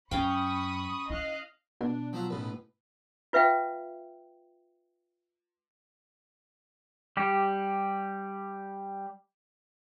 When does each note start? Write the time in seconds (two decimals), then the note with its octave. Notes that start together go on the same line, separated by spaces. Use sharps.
0.11 F#2 C#4 F5 G5 B5 C#6 D#6
1.10 E4 D#5 F5 F#6
1.81 B2 D4
2.13 F3 F#3 C4 F4
2.30 B1 A2 C#3 B4
3.33 F4 B4 E5 F5 G5
7.17 G3 G4